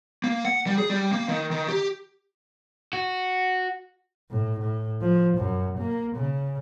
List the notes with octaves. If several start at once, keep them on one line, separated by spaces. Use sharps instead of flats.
A#3
F#5
G3
G#4
G3
A#3
D#3
D#3
G4
F#4
A2
A2
F3
F#2
A#3
C#3